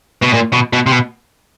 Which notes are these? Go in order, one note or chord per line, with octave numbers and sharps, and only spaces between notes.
B2
A#2
B2
B2
C3
B2